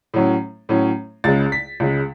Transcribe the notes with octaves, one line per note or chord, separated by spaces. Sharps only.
A2 F#3 C#4
A2 F#3 C#4
C#2 C#3 G#3 A6
B6
C#2 C#3 G#3